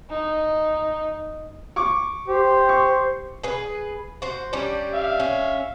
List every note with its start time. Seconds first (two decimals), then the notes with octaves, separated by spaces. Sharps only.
0.10 D#4
1.76 C#6 D6
2.28 G4 C5
2.69 C#6
3.43 G#4 B4
4.22 F#4 C5
4.53 G3 C#4 D4
4.93 E5 F5
5.20 C#4